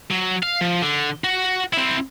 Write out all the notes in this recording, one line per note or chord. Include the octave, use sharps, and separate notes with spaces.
F#3
F5
F3
D3
F#4
C4 E4